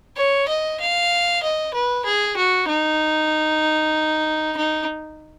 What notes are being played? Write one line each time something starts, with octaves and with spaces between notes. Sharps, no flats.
C#5
D#5
F5
D#5
B4
G#4
F#4
D#4
D#4